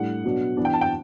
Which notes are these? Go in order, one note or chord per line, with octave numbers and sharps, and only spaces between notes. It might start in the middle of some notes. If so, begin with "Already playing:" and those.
Already playing: A2 G3 D4 F#5
B2 F#3 B3 D4
E3 B3 D4
G5
A5
G5